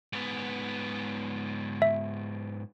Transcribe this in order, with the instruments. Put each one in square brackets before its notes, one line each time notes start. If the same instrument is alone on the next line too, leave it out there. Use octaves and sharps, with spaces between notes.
[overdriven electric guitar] G#2 B3
[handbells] E5